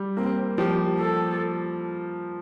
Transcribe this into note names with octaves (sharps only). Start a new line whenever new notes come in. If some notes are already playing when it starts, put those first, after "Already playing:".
Already playing: G3
A#3 C4
F3 G4
A4